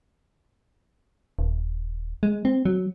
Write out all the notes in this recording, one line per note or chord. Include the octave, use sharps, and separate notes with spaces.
D#1
G#3
C4
F#3